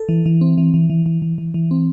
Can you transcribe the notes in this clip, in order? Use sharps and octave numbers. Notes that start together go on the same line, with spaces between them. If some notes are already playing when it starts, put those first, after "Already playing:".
Already playing: A4
E3
E3
C4
E3
E3
E3
E3
E3
E3
E3
C4